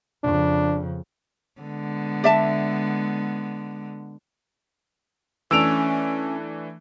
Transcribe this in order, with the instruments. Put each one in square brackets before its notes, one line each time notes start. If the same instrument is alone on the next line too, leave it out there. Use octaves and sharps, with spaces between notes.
[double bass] F2 C#3 [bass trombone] D4
[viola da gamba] D3 G#3 B3
[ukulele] D5 E5 A5
[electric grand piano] E3 A3 D4 [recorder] C#4 [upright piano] E6 D7 F7